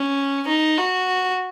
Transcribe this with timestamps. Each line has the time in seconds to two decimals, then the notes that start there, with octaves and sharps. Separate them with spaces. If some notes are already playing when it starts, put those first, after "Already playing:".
Already playing: C#4
0.47 D#4
0.78 F#4